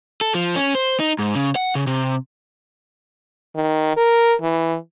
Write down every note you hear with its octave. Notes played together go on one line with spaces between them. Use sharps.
A4
F3
C#4
C5
D#4
G#2
C#3
F#5
C#3
C3
D#3
A#4
E3